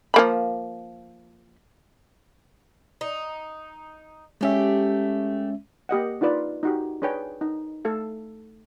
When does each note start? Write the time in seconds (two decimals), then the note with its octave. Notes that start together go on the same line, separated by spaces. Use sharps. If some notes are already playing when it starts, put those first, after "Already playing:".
0.14 F3 A#3 B5
3.01 D#4
4.41 G#3 A3 C#4 G4 E5
5.89 A#3 G4 D#5 F#5
6.21 D4 D#4 F4 B4 D5
6.63 D#4 F#4 G4
7.02 D4 G#4 B4 C#5 G5
7.41 D#4
7.85 A3 A4 F5